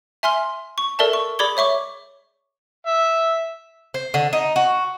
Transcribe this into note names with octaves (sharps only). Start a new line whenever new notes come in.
E5 G#5 C6 F6 G7
C#6
A4 A#4 D5 E5 A5
C#6
G#4 D5 B5 D6 G#6 G7
C#5 E5 C#6 D6
E5
C5
D3
D#4
F#4